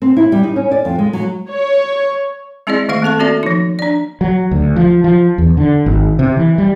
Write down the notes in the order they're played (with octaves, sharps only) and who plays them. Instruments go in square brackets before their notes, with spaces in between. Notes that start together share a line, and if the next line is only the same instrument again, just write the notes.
[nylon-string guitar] C4
E4
G3
D#4
C#4
D5
F2
G#3
F#3
[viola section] C#5
[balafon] G#3 C4 E4 G#4 D5 D#5
D#3 A3 E5 F5 C#6
A#3 C4 A4 A5 C#6
C4 C#4 F#4 A4 D5 E5
F3 D#4
D4 D5
[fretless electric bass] F#3
D2
F3
F3
E2
D3
G#1
C3
E3
G3